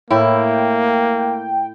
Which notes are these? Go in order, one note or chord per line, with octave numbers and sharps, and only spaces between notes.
A2 A#3 E4 G5